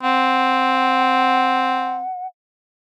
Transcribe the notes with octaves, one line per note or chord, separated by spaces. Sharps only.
C4 F#5